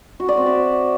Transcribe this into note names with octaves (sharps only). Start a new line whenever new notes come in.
F#4
D5
C4
E5